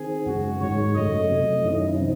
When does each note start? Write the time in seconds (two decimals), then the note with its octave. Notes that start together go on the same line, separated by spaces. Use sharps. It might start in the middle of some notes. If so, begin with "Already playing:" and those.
Already playing: D#3 C4 G#4
0.26 F#2 C#3 G#3 F#4
0.61 G#2 D#3 G#3 C#5
0.95 F#2 C#3 F#3 A3 D#5
1.30 C3 F#3 A3
1.64 F#2 D#3 F#3 C#4 E4
1.98 C3 E3 C4 D#4